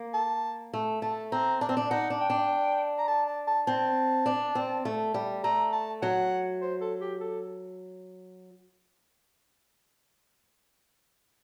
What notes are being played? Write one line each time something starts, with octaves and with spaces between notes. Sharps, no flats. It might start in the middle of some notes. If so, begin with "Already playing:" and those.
Already playing: A#3
A5
A3
A3 A5
C4 A#5
D4 A5
C4
D4
D#4 F#5
D4
G5
D4
A#5
A5
A5
A5
C4 A5
D4
C4
A3
G3
A3 A#5
A5
F#3 F#5
C5
A4
G4
A4